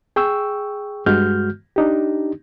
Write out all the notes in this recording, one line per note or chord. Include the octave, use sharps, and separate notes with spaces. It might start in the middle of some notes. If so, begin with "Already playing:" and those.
G#4 G5 C#6 E6
G2 G#3 F#4 F6 G6
D4 D#4 G4